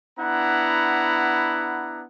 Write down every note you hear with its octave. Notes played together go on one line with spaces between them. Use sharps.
B3 D4 E4 F#5 A#5